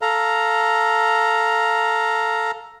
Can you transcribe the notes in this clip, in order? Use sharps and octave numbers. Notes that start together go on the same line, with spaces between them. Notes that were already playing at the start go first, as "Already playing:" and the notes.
A4 F5 A#5